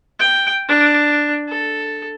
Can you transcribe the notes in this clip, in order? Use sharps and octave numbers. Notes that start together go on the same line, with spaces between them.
G5
D4
A4